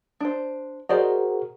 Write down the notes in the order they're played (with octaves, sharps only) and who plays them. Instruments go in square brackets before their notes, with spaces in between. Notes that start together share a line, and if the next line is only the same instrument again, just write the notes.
[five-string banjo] D4 C5
[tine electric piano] F#4 G#4 A#4 [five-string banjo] C5 D5 D#5